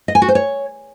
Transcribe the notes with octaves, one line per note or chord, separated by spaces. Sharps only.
D#5
G#5
F#4
C5
C#5